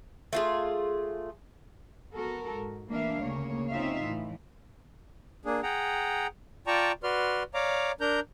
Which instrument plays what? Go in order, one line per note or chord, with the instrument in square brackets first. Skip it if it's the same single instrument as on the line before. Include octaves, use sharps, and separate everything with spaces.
[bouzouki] A3 F4 G#4
[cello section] B3 F#4 A4 A#4
G#2
E3 A3 A#3 D4 E5 F5
D2 C#3 A#3 C#5
C4 C#4 D#4 F4 E5 F5
A2 E3
[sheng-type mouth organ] A#3 D4 G#4
G#4 F#5 G5 A#5
F4 D5 G5 A5 A#5 C#6
F#4 B4 D5 C6 F6
C#5 D5 F5 A#5 D6
D4 A#4 A#5 G6